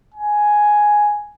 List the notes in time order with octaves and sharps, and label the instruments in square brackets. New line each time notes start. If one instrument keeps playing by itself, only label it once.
[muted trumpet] G#5